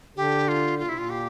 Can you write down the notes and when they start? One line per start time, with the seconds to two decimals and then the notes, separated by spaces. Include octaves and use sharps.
0.16 D3 G4
0.48 F4
0.79 A#2 F4
0.87 C3 E4
0.94 A#2 F4
1.10 G4